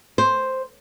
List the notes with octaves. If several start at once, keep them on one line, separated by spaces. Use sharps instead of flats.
C5